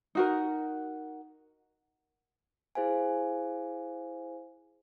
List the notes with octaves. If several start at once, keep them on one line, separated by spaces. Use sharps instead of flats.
D#4 F#4 A#4
E4 G#4 C5 F5 G#5